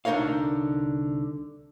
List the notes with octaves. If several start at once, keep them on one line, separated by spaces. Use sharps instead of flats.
C2 D3 D#4 A#4 C#5 F5